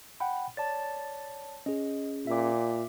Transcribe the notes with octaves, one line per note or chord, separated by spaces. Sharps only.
F#5 G5 B5
C#5 D5 A5 A6
C#4 G#4 D#5
A#2 E5 D6